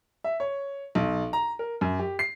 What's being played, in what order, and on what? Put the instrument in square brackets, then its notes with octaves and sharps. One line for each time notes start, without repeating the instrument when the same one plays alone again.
[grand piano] E5
C#5
B1
A#5
A#4
F#2
G4
C7